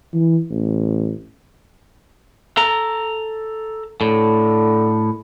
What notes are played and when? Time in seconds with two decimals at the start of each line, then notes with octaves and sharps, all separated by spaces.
0.14 E3
0.51 A1
2.57 A4 A#5
4.01 A2 D3